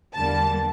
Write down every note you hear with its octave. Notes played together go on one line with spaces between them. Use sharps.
E2 D3 G3 A#3 A5